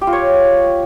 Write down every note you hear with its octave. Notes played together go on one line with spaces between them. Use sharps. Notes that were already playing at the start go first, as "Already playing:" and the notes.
G4
F4
C#5